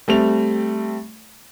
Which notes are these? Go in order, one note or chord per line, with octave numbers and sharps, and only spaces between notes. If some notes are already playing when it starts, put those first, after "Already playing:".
G3 A3 C4 F7